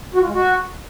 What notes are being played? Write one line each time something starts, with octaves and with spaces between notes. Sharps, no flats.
F#4
F4
G#3
F#4